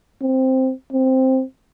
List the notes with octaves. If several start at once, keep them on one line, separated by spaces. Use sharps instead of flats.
C4
C4